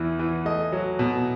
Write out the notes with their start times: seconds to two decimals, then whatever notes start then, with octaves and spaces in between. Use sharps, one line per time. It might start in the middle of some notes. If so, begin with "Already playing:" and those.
Already playing: E2 E3
0.19 E3
0.45 A3 D#5
0.72 F#3
0.99 B2